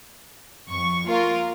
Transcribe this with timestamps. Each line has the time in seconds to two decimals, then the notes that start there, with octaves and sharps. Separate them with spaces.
0.69 F2 C#6
1.09 A#3 F4 A#4